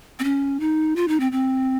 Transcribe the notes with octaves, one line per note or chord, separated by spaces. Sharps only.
C4
C#4
D#4
F4
D#4
C4
C4